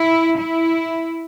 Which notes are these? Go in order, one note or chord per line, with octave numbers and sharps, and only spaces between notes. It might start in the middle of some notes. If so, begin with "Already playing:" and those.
Already playing: E4
E4